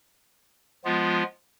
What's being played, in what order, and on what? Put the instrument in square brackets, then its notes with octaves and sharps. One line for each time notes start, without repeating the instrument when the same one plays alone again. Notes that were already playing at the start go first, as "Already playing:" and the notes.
[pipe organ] F3 G#3 B3 F4